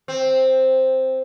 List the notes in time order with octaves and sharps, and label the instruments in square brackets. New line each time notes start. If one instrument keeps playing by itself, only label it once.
[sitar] C4